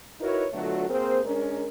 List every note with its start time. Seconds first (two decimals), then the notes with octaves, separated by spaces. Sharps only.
0.20 D#4 E4 F#4 A#4 B4 C#5
0.53 B2 D3 F#3 A3 F4 F#4
0.89 A#3 C4 G#4 A#4 C5
1.25 G#3 C#4 D4 A#4